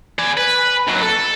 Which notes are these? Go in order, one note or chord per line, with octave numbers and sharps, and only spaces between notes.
G#4 D5
B4
D#2 F#3
A4